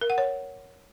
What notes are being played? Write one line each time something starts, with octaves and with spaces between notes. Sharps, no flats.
A#4
F#5
C#5